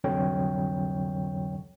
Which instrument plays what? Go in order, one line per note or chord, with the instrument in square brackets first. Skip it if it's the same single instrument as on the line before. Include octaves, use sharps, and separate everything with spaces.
[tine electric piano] C2 F2 D3 F#3 C#5 G5